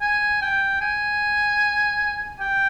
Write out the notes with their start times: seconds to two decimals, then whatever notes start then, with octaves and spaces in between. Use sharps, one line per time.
0.01 G#5
0.42 G5
0.81 G#5
2.40 G5